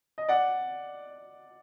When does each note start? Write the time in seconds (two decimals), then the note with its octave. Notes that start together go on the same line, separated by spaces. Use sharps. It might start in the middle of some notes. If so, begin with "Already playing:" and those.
0.18 D#5
0.28 D5 F#5